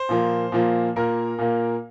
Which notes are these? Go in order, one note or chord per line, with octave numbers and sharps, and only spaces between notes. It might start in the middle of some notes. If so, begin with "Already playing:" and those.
Already playing: C5
A#2 F3 A#3
A#2 F3 A#3
A#2 A#3 A#4
A#2 A#3